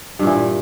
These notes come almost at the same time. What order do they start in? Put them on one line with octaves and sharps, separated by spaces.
G2 A#2 E3